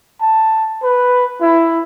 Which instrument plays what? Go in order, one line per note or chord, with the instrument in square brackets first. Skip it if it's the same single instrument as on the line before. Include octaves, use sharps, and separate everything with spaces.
[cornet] A5
B4
E4